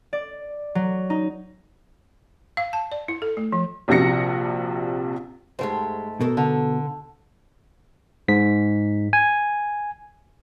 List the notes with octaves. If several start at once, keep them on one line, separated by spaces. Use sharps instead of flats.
D5
F#3
D#4
F5
A5
D5
E4
A4
A3
F3
A#1 C3 F3 F#4 A#6 C#7
G#2 G#3 A3 G4 C5
B2 A4 A#4
D3
G#2 B6
G#5